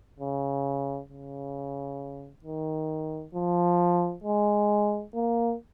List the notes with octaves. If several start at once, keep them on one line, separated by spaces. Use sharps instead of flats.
C#3
C#3
D#3
F3
G#3
A#3